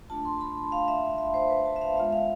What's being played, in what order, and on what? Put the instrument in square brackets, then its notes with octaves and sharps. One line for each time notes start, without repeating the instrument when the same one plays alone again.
[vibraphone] A3 D4 F4 A5
C6
B5
F5
E5
E5
C5
B4
A5
E5
F5
G#3 B3 F4 E5
F5